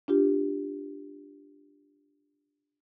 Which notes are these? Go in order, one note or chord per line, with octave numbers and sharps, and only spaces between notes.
D4 F4 G4